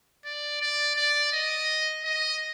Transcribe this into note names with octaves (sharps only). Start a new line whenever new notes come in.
D5
D5
D5
D#5
D#5